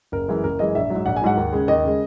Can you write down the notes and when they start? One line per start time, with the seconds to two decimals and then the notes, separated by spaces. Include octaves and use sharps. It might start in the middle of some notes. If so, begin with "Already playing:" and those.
0.12 F#1 A#4
0.28 F#2 E3 G#3
0.44 F#1 A#4
0.59 F#2 E3 G#3 D#5
0.75 A#1 E5
0.90 G#2 F#3
1.06 A#1 F#5
1.16 G#5
1.22 G#2 F#3 F#5
1.37 D#2
1.53 C#3 G#3
1.68 D#2 D#5
1.84 C#3 G#3